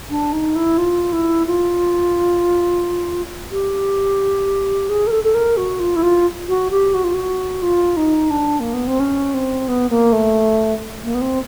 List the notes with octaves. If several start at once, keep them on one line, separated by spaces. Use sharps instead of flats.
D4
D#4
E4
F4
E4
F4
G4
G#4
A#4
A4
A4
A#4
F#4
F4
E4
F4
F#4
G4
F#4
F4
F#4
F4
D#4
D4
A#3
B3
C4
C#4
C4
B3
A#3
A3
A#3
B3
C4